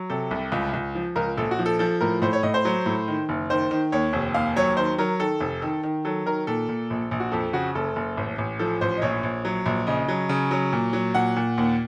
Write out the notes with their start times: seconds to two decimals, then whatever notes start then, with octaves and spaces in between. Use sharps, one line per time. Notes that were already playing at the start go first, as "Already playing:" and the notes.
Already playing: F#3
0.10 C3 A4
0.31 C2
0.52 C#2
0.73 C#2
0.95 F3
1.16 C#2 A#4
1.37 A#1 A4
1.51 F#4
1.59 F3
1.66 A4
1.79 F3 A4
2.01 A2 A#4
2.22 A2 C5
2.33 C#5
2.43 A2 D#5
2.54 C5
2.65 F#3
2.86 A2
3.08 D#3
3.29 F#1
3.50 D#3 C5
3.71 D#3
3.92 D#2 C#5
4.13 F1
4.34 D#2 F5
4.56 F#3 C#5
4.77 D#3 C5
4.98 F#3 A#4
5.19 D#3 A4
5.40 F1
5.62 D#3
5.83 D#3
6.05 F#3 A4
6.26 D#3 A#4
6.47 A#2 A4
6.69 A#2
6.90 A#1
7.11 A#1
7.20 F#4
7.32 F2 A4
7.53 C#3 F#4
7.75 F#1 A4
7.96 F#1
8.17 A1
8.38 A1
8.59 F3 A4
8.81 A1 C5
8.97 D#5
9.02 A#1 C#5
9.23 A#1
9.45 F#3
9.66 A#1
9.87 C#3 D#5
10.08 F#3
10.29 C#3
10.51 F#3
10.73 A#2
10.93 F#3
11.14 A#2 F#5
11.36 A#2
11.58 D#2